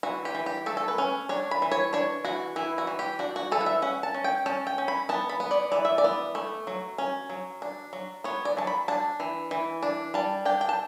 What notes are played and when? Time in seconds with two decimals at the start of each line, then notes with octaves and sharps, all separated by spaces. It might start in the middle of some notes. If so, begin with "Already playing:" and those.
0.03 E3 F#4
0.25 G4
0.35 E3
0.46 G4
0.66 A3 A4
0.77 A4
0.88 B4
0.98 C#4
1.29 D4 C#5
1.51 B5
1.62 E3
1.71 C#5
1.93 D4 C#5
2.25 E3 F#4
2.56 E3 E4
2.78 F#4
2.87 E3
2.99 G4
3.19 D4 F#4
3.36 F#4
3.52 E3 A4
3.61 F#5
3.66 E5
3.82 C#4 F#5
4.03 A5
4.14 C#4
4.24 G5
4.46 C#4 A5
4.67 G5
4.78 C#4
4.88 B5
5.09 B3 A5
5.29 B5
5.40 B3
5.51 D5
5.72 E3 D5
5.85 E5
5.98 D5
6.04 B3
6.35 A3
6.67 F#3
6.98 C#4
7.30 F#3
7.62 D4
7.93 F#3
8.24 B3 C#5
8.45 D5
8.57 F#3 A5
8.67 B5
8.88 D4 A5
9.20 E3
9.51 E3
9.83 D4
10.14 G3 A5
10.45 D4 G5
10.61 G5
10.69 A5